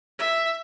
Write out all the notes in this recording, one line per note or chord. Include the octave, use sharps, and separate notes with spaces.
E5